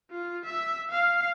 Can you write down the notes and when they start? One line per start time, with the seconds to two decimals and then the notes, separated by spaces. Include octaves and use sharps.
0.11 F4
0.45 E5
0.91 F5